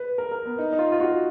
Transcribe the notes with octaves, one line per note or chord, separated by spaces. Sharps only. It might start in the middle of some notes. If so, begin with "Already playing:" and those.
Already playing: B4
A#4
A#4
B3
D#4
D#4
F4
F4
F#4